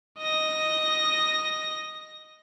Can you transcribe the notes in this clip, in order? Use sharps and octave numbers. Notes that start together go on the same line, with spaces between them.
D#5 A#6